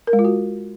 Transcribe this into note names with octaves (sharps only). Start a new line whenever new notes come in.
A#4
G#3
F4
F#4